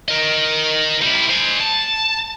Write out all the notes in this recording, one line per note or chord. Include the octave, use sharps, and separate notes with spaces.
A#4 D#5
G3 E4
C5 G#5
A5